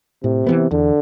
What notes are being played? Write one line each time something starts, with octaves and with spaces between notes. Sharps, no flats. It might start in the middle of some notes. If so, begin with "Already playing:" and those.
A2 C3
E3 G3 B3
E2 D3